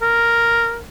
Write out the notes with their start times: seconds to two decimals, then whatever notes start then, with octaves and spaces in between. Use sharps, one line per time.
0.02 A#4